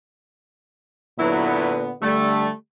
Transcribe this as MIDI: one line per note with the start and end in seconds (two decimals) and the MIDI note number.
1.19 1.91 46
1.19 1.91 50
1.19 1.77 54
1.19 1.91 59
1.19 1.77 64
2.02 2.48 50
2.02 2.48 55
2.02 2.51 57